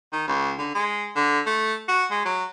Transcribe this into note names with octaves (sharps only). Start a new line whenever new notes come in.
D#3
C#2
D3
G#3
D3
A3
F#4
G#3
F#3